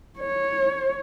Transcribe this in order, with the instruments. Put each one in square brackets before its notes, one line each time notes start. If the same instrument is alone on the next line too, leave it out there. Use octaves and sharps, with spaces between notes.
[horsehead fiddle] C#5